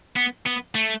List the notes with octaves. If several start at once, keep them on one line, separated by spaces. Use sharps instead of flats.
B3
B3
A3